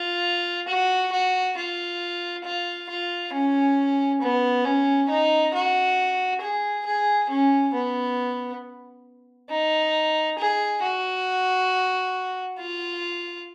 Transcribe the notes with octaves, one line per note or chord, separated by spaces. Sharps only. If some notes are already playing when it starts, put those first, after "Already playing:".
Already playing: F4
F#4
F#4
F4
F4
F4
C#4
B3
C#4
D#4
F#4
G#4
G#4
C#4
B3
D#4
G#4
F#4
F4